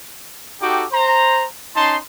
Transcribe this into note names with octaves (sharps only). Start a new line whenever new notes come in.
D#4 F#4 G4 A4 G5 D6
C5 A#5
C#4 D#4 A5 C6